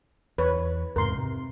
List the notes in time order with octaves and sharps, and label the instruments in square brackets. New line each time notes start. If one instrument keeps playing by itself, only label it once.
[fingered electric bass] E2 [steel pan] B4 C#5
[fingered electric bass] E2 G#2 C3 [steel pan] A#4 C6
[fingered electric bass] C3